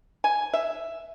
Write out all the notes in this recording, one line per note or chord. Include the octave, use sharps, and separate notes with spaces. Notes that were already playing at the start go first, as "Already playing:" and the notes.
G#5
E5